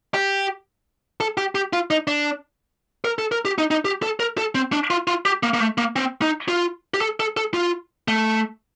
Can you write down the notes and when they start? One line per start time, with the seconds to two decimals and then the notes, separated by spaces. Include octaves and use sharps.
0.14 G4
1.20 A4
1.37 G4
1.55 G4
1.73 F4
1.90 D#4
2.07 D4
3.05 A#4
3.19 A4
3.32 A#4
3.45 G4
3.58 D#4
3.71 D#4
3.85 G4
4.03 A4
4.20 A#4
4.38 A4
4.55 C4
4.73 D4
4.90 F4
5.07 F4
5.25 G4
5.43 A#3
5.54 A#3
5.60 A3
5.78 A#3
5.96 C4
6.22 D#4
6.48 F4
6.94 G4
7.01 A4
7.20 A4
7.37 A4
7.54 F4
8.08 A3